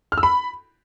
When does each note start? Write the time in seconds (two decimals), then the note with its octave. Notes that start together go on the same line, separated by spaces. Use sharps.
0.12 F6
0.18 E6
0.23 B5